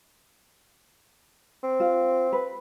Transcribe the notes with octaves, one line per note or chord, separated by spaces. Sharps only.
C4
F4
B4